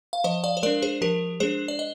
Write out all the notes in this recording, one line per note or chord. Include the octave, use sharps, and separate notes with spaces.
F5
F3 C5 D#5
D5 F5
C5
G#3 D4 A#4 D5
G#4 C5
F3 G4 A#4
G#3 D4 G#4 C5
D5
D#5